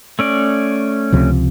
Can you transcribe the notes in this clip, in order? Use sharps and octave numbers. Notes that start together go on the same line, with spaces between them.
A3 C#4 D5
C#2 C3 F3